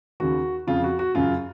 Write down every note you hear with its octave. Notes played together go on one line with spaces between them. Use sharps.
D#2 C#3 F#4
F2 C#3 F4
F#4
F#4
F#2 C#3 F4